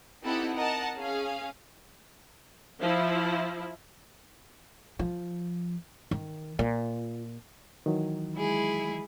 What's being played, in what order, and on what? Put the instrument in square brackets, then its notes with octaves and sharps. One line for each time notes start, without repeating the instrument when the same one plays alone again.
[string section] C4 D#4 E4 G4 A4 F#5
A#4 D#5 F#5 A5
C#4 G#4 F5
[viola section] F3 E4
[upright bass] F3
D#3
[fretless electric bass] A#2 [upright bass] F4
[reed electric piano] D#3 E3 F#3
[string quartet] G#3 E4 G#4